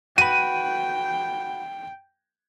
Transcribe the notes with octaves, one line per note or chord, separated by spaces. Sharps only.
F#4 B4 G5 D#7